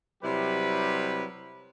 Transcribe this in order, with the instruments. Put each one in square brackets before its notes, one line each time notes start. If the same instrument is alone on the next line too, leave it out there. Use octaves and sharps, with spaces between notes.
[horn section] C3 F#3 G3 E4 G4 B4